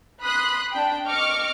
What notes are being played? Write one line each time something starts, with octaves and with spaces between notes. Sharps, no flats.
B5 C6 D#6 F#6
D4 G5
D#5 C#6 D6 F6 C#7